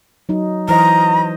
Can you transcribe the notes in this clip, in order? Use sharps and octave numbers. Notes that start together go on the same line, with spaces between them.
F#3 D#4
E3 C5 D#5 A#5